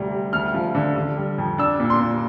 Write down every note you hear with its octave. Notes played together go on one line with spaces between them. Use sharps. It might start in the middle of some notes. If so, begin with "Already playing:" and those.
Already playing: D2 C3 G3
G3
D2 F6
F3
D3
D3
G3
F2
D4 E6
A#2
C6
A#2